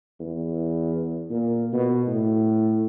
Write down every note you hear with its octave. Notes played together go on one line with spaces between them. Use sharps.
E2
A#2
B2
A2